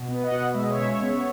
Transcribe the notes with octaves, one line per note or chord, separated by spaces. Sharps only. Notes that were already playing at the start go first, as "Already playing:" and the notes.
Already playing: B2
B3
D#5 F#5
B2
G#3 E5
D#5
C#5 E5
C#3
B3